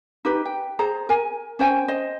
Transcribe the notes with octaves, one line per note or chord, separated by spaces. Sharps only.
D#4 G4 B4
G5
G#4 C5 A#5
A#4 G#5
C#4 C5 G5 G#5
C5 D#5